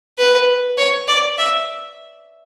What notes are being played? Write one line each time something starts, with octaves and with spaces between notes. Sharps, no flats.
B4
C#5
D5
E5